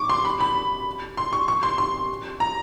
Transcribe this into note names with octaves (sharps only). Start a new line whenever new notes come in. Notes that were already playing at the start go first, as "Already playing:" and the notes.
Already playing: C#6 D6
C6
B5
B5
C6
C#6
C#6
C6
C6
A#5